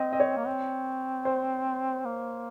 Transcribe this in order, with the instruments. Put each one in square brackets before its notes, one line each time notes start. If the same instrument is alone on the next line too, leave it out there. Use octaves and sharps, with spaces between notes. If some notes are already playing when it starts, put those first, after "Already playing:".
Already playing: [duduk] C4 [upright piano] D#5
[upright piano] D#5
C#5
[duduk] A#3
C4
[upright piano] C5
[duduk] A#3